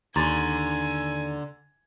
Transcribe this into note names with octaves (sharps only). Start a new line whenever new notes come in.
D#2 D3 G#5 A#5 C6 A6